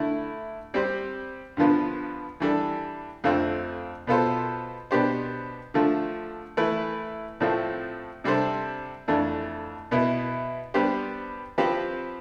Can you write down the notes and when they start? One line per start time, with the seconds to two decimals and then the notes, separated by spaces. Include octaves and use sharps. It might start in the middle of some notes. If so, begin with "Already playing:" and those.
Already playing: D3 A3 E4
0.74 G3 C4 G4 C5
1.57 G2 D3 F3 B3 F4
2.40 E3 G3 D4 A4
3.24 F2 D3 A3 C4 F4
4.07 B2 B3 F4 A4 C5
4.91 B2 B3 D4 G4 C5
5.74 D3 F3 A3
6.57 E3 A3 E4 B4
7.40 A2 F3 A3 C4
8.24 C3 G3 D4 A4 C5
9.08 F2 E3 A3 D4
9.91 B2 B3 E4
10.74 G3 B3 D4 G4 C5
11.58 F3 C4 G4 B4